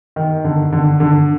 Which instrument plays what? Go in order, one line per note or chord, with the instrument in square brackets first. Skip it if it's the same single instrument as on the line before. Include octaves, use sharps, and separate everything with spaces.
[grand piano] D#3
D3
D3
D3